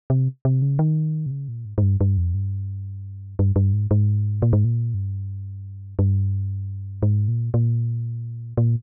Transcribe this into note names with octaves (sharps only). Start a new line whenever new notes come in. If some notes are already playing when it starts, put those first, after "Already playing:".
C3
C3
C#3
D#3
C3
C#3
A#2
G#2
G#2
G2
G2
F2
G2
G2
G2
G#2
G#2
A#2
G#2
A#2
G2
G2
G#2
A#2
A#2
A#2